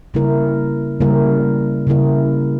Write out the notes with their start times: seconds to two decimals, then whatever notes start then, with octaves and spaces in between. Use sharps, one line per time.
0.14 C#3 G3 A#3 E4 A#4
1.01 C#3 G3 A#3 E4 A#4
1.87 C#3 G3 A#3 E4 A#4